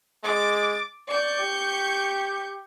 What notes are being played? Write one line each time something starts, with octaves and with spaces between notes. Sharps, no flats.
G#3 D6 A6
D5 C#6 G6
G4